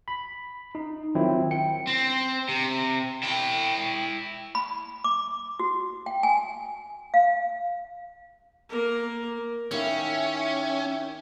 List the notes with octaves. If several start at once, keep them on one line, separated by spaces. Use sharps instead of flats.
B5
D#4
D#3 F3 F#3 C4 E4
G5 C#7
C4
C3
E4 G5
B5
D6
F#4
G5
G#5
F5
A#3 A#4
D#3 A#3 C#4 E4 G4 C#5 E5